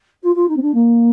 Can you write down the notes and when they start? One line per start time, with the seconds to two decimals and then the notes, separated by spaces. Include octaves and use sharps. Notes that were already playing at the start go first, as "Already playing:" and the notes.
0.23 F4
0.34 F4
0.48 D#4
0.56 C4
0.61 D4
0.74 A#3